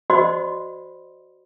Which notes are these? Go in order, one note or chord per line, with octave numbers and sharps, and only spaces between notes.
F#4 C5 D5 D#5 B5 C6